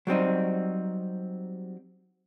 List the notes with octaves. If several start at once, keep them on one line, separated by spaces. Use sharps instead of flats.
F#3 G3 C4 D#4